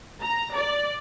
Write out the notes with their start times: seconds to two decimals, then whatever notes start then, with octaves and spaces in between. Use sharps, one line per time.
0.21 A#5
0.56 D5